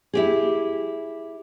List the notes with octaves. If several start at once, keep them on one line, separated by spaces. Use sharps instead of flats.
E4 G4 G#4